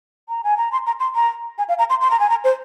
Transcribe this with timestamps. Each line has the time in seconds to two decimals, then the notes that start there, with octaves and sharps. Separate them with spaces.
0.29 A#5
0.44 G#5
0.57 A#5
0.72 C6
0.87 A#5
1.00 C6
1.15 A#5
1.58 G#5
1.69 F5
1.79 A#5
1.90 C6
2.01 C6
2.11 A#5
2.20 G#5
2.30 A#5
2.44 C5